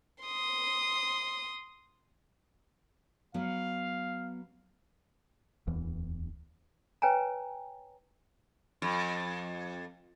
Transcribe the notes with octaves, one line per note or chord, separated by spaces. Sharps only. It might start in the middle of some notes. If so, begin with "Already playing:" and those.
C6 D#6
F#3 B3 F5
D1 E2 E3
B4 C#5 G5 G#5 A#5
F2